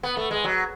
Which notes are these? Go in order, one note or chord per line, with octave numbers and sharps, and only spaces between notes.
B3
A3
G#3
F#3